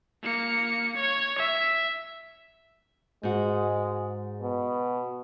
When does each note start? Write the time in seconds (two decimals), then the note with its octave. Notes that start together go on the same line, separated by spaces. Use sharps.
0.22 A#3 C#7
0.97 C#5
1.38 E5
3.23 G#2 G#3 F#4
4.41 B2